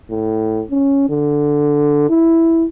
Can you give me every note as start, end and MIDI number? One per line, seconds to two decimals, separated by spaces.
0.11 0.62 45
0.71 1.08 61
1.10 2.07 50
2.10 2.65 64